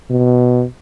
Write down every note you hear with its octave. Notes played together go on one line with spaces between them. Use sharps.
B2